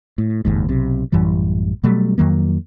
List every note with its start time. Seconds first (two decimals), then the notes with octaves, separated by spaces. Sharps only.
0.18 A2
0.45 F#1 D#2 G#2
0.69 B1 C3
1.12 A1 F#2 E3 G3
1.84 B2 F#3 G3 A3
2.18 F2 D#3 F#3 A#3